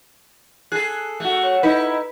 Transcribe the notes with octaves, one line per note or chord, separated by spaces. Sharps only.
G#4 A4 F#6
A3 F#4
C#5
D#4 E4 B4